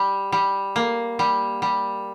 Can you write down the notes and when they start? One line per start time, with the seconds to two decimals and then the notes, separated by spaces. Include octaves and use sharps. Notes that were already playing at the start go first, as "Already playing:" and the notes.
Already playing: G3
0.32 G3
0.76 A#3
1.19 G3
1.62 G3